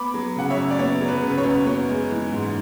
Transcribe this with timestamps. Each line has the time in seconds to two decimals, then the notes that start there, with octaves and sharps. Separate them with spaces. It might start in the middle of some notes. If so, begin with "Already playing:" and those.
Already playing: B3 B5 D6
0.14 F#3
0.36 C#3 F#5
0.50 C#5 E5
0.57 F#2
0.70 D5
0.79 B3 C#5
1.01 F#3
1.08 B4
1.22 C#3 B4
1.38 C#5
1.44 F#2
1.66 B3 C#5
1.88 G#3
2.10 E3
2.32 G#2